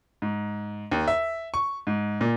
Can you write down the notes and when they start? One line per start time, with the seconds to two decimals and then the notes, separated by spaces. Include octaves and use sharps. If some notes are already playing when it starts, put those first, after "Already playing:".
0.22 G#2
0.92 D#2
1.08 E5
1.54 C#6
1.87 G#2
2.21 A#2